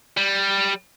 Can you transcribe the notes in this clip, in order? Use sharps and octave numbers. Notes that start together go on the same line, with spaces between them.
G3